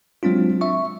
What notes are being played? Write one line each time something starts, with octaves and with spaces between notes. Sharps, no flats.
F#3 G#3 C4 D4 F4
E5 C#6